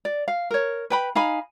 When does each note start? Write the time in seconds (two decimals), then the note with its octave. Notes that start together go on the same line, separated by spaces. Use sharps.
0.05 D5
0.28 F5
0.51 A#4 C#5
0.90 B4 G5 B5
1.15 D#4 F5 G#5 B5